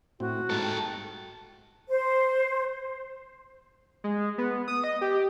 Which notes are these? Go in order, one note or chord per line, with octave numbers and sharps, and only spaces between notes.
A2 C4 F#4
G#2 G3 A4 A5
G5
C5
G#3
B3
D#6
D#5
G4